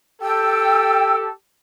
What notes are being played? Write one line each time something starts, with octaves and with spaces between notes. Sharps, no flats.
G4 A4 G5 E6